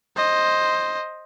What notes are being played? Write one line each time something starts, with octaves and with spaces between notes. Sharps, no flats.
C5 D#5